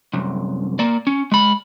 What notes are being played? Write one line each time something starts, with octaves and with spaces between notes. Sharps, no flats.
C2 F#2
A#3 D5
C#4
G#3 B5